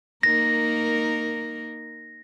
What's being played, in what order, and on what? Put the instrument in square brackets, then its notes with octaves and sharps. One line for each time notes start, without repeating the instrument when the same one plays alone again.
[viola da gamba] A#3 D#4 A#4 [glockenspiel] A#6